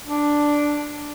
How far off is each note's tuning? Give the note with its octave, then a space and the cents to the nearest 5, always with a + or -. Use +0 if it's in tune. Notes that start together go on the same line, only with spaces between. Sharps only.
D4 +0